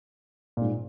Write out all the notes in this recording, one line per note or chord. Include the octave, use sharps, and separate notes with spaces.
A#2
G#2